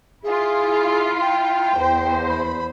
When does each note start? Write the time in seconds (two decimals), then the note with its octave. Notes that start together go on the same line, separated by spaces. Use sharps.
0.23 E4 F4 G#4
1.21 G5
1.75 E2 C5
2.29 B5